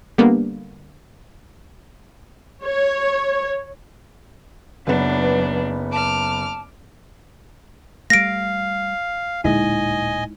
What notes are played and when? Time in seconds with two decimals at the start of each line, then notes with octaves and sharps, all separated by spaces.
0.18 D3 G3 A#3 B3
2.64 C#5
4.87 F#1 F#3 B3 D4 B4
5.92 A5 D6 F6
8.10 G3 A3 F5 A#6 D7
9.44 D1 A#2 D3 G#3 D#4 E4 D#5 G#5